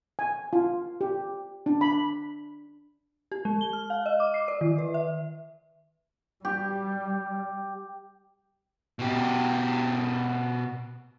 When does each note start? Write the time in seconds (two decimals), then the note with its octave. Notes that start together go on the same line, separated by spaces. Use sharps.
0.19 G#5
0.53 F4
1.01 G4
1.66 D4
1.81 B5
3.32 G4
3.45 G#3
3.61 G7
3.73 F6
3.90 F5
4.06 D#5
4.20 D6
4.34 C7
4.48 D5
4.61 D#3
4.78 B4
4.94 E5
6.45 G3 G4
8.99 B2 G4